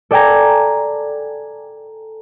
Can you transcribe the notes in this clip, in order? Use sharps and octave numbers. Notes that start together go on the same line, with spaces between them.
A4 D5 G5 G#5 A#5